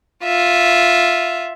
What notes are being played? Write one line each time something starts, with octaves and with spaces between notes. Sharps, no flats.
F4 E5